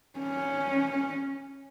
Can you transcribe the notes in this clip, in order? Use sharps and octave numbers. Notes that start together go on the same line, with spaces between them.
C#4